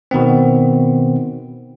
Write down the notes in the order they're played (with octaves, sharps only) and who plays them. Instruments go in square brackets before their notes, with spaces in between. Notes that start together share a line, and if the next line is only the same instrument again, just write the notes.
[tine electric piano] B2 D#3 B3 C4